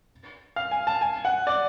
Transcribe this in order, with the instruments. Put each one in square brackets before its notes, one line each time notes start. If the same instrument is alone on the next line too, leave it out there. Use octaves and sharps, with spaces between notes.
[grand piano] F5
G#5
A5
G#5
F#5
D5